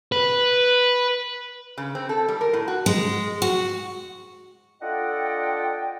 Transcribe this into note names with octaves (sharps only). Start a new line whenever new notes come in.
B4
C#3
C4
A4
G3
A#4
A2
F#4
G#3
F#4
D4 F4 A4 D#5 F#5 G5